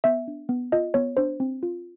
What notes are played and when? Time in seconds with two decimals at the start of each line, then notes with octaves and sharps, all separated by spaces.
0.04 B3 E5
0.28 D4
0.49 B3
0.72 F4 D#5
0.94 B3 C#5
1.17 D4 C5
1.40 C4
1.63 F4